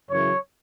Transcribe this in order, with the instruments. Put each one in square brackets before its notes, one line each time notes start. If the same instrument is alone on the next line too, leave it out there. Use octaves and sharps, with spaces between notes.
[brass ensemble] F#2 C#3 E3 C#5